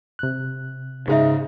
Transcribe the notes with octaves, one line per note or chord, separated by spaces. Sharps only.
C3 F#6
G#2 C#3 G#3 D#4 G4 C5 E5